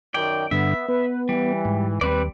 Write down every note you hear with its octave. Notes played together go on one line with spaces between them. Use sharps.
F#2 D#3 D5 G5
G2 D3 B3 E5
B3 B4
E3 G3
G#2
D#2 G3 C4 B4 D5